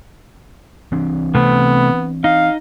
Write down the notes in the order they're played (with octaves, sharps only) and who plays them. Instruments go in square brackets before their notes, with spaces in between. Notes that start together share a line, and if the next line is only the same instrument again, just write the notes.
[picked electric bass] E3 C4 D4
[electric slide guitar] C3 A3 [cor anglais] B3
[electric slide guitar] D#4 [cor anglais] F5